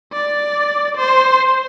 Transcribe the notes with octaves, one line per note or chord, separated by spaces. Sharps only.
D5
C5